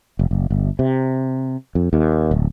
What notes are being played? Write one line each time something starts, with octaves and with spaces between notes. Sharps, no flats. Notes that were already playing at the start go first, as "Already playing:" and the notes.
F1
F#1
G1
C3
F2
D#2
D1